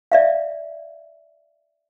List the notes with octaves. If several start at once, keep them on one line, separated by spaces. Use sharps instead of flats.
D5 E5 F5